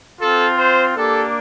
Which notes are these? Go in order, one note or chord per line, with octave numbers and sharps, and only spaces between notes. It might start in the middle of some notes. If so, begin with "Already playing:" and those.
C4 F4 A4
C5
A#3 D4 G4 A4